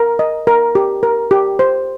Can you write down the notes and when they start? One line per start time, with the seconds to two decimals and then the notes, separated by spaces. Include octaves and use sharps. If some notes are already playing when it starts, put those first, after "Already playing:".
Already playing: A#4
0.19 D#5
0.47 A#4
0.75 G4
1.03 A#4
1.31 G4
1.59 C5